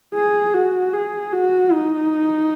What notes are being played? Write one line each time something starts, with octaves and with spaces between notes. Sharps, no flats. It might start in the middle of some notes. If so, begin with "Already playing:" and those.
G#4
F#4
G#4
F#4
D#4